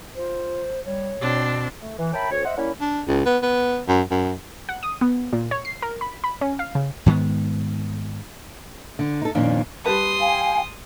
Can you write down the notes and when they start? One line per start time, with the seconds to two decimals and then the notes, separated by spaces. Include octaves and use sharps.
0.15 F4 C5
0.85 G3 C#5
1.21 B2 C4 D4
1.81 A3
1.99 E3
2.14 A#4 C#5 E5 G5 A5 B5
2.31 D2 C#5
2.45 C5 D#5 E5 F#5
2.58 G3 A#3 C#4 E4
2.81 D4
3.07 C#2
3.26 B3
3.42 B3
3.88 F#2
4.11 F#2
4.69 F#5
4.83 D#6
5.01 B3
5.33 A#2
5.51 C#5
5.65 C7
5.82 A#4
6.01 B5
6.24 B5
6.41 C#4
6.59 F5
6.75 C#3
7.06 G#2 D#3 G#3 B3
8.99 D3
9.22 D#4 A4
9.35 F2 A#2 D#3 A#3 C#4 D4
9.86 G3 B4 A5 C6 D#6
10.20 F5 G5 G#5